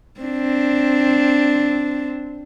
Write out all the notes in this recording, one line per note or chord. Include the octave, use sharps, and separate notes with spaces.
C4 D4